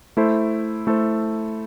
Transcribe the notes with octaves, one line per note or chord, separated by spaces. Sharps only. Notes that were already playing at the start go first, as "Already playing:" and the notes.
A3 E4 A4 C5
A3 E4 A4 C5